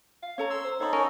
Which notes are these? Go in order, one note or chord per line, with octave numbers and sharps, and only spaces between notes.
F5
C#4 A4 C#5 A#5
C6 E6
C5
D#4 A4 C#5 F5 B5
C#4 A#4